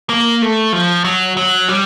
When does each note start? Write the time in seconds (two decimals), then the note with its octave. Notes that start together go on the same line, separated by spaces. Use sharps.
0.09 A#3
0.42 A3
0.73 F3
1.04 F#3
1.37 F#3
1.68 G3